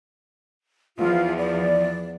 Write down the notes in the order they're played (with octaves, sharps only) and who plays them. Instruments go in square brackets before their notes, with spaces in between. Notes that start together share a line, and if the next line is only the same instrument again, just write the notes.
[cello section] E2 F3 [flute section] F4
[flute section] D5